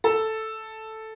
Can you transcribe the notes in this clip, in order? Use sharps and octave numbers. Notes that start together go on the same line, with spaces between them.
A4